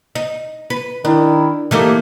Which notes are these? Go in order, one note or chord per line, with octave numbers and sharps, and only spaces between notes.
D#4
B4
D#3 D4 E4
E3 A3 A#3 D#4 G4